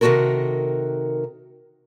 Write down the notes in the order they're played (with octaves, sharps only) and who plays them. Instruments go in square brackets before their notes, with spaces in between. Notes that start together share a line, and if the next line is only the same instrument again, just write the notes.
[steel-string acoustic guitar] C3 D#3 A3 F#4 A4 A#4